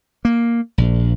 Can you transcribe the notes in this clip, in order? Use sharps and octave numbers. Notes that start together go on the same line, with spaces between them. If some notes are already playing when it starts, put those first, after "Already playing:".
A#3
A#1